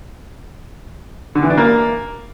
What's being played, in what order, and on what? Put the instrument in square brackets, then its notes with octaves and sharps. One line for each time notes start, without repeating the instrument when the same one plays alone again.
[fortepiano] D3
E3
D4
A#3